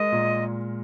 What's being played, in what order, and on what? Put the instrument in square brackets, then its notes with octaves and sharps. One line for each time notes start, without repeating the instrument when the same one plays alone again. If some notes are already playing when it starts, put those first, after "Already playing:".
Already playing: [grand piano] G#3 A#4 [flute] D#5
[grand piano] A#2